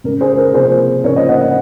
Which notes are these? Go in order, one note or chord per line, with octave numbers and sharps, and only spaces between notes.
C#3 G#3 A#4
G#4 C5
A#4
C3 F3 A#3 G#4 C5
C#3 F3 A#3 A#4 C#5
C5 D#5
D#5 F#5
D#5 F#5